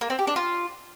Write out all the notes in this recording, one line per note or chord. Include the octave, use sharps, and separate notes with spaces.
A#3
C4
G4
D4
F4